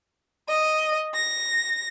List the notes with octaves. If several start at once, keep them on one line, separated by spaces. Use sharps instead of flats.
D#5
A#6